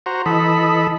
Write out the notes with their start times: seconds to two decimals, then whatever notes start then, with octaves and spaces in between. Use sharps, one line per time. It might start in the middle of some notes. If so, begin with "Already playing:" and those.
0.06 F#4 C5 A#5
0.26 E3 A4 D#5 B5